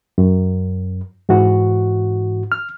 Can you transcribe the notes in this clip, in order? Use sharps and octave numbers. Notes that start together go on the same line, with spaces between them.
F#2
G#2 E3 F#4
F6